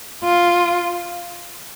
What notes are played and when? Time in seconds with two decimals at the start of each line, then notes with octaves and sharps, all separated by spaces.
0.24 F4